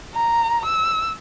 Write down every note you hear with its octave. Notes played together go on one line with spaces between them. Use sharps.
A#5
E6